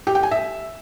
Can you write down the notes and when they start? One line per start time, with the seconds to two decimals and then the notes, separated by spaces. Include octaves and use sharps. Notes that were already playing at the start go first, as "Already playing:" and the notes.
0.07 G4
0.15 G5
0.23 G#5
0.31 E5